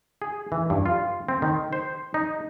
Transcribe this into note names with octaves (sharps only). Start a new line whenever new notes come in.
G#4
E3
G2
F4
C4
D#3
C5
D#4